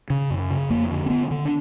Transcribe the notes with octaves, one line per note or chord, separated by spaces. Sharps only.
C#3
F#2
C#3
F2 A#3
D3
C4
D3 B3
D3
D4